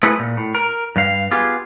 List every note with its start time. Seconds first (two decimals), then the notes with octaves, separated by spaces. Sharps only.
0.03 A3 E4 G#4 A4 B4
0.19 A#2
0.37 A2
0.55 A#4
0.96 G2 G3 F5
1.31 B3 F4 G4 G#4